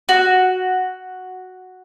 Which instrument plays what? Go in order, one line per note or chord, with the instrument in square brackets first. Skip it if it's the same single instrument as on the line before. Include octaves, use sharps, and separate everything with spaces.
[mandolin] F#4